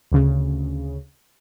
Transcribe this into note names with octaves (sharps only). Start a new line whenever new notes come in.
D2 C#3